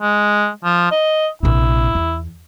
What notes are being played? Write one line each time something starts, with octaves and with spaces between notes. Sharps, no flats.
G#3
F3
D#5
A#1 C3 E4
E2